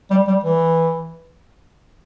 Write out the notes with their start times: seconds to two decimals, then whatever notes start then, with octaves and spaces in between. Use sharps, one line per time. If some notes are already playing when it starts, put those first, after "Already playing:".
0.10 G3
0.27 G3
0.44 E3